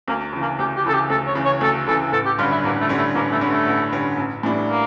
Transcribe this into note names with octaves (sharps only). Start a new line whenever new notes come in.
D2 A#3
C#3 E3
A#3
D2 G4
G4
C#3 E3 A4
G4
D2 A4
C#5
C#3 E3
C#5
D2 A4
C#3 E3 A4
A1 A4
G4
G2 D3 G3 C#4 F4
E4
A1 A#3
A3
G2 D3 G3 C#4
A3
A1 A#3
A3
G2 D3 G3 C#4
A3
A1
G2 D3 G3 C#4
A1
A2 E3 G3 D4
A#3